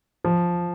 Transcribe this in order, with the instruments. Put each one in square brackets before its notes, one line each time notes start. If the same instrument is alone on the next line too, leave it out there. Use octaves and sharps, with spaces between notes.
[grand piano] F3